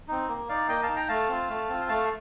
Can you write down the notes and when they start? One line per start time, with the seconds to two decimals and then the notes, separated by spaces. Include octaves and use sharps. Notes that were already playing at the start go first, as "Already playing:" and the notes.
0.08 C4 D#4
0.28 A#3
0.49 D#4 D5 F5
0.68 A#3 D#5 G5
0.83 F5 A5
0.88 D#4
0.96 G5 A#5
1.09 A3 F5 A5
1.28 C4 F4
1.49 A3
1.69 C4 F4
1.89 A3 F5 A5